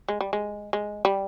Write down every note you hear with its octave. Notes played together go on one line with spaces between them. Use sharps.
G#3
G3
G#3
G#3
G3